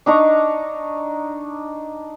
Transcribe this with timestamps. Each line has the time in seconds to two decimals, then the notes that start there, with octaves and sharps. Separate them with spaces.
0.06 D4 D#4 A#5 C#6